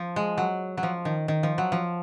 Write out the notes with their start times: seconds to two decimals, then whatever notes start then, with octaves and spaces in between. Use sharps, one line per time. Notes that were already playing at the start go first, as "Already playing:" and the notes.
Already playing: F3
0.16 G#3
0.38 F#3
0.77 F#3
0.83 F3
1.05 D#3
1.28 D#3
1.43 F3
1.58 F#3
1.72 F3